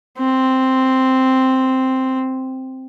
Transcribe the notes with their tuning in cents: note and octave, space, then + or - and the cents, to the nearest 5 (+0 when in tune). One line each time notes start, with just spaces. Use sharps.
C4 +0